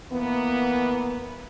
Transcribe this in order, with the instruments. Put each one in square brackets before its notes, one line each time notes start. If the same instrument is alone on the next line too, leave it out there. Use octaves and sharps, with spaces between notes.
[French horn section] E3 A#3 B3